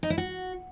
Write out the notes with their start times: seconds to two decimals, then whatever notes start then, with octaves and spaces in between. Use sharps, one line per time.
0.03 D#4
0.10 E4
0.18 F#4